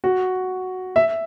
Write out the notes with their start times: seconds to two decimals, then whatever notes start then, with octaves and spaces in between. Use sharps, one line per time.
0.04 F#4
0.96 E5